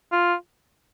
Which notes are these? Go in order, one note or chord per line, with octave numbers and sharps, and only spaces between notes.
F4